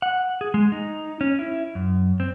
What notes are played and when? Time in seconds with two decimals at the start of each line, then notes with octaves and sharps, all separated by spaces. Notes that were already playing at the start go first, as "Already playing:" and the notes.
0.02 F#5
0.41 G#4
0.54 G#3
0.72 D#4
1.21 C#4
1.39 E4
1.75 F#2
2.20 C4